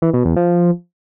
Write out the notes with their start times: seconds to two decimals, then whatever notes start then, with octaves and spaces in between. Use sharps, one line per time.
0.02 E3
0.13 B2
0.25 E2
0.36 F3